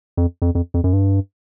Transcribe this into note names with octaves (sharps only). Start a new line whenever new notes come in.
F2
F2
F2
F2
F#2
G2